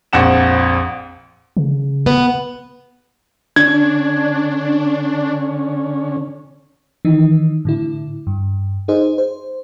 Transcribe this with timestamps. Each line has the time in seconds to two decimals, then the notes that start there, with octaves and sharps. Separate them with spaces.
0.13 A#1 F2 F#5 E7
1.57 C#3
2.06 B3
3.56 D3 C#4 D4 G#6
7.05 D#3 E3 D#4
7.65 A2 D3 E4
8.27 G2
8.88 D#4 G#4 C5 D#5
9.18 C5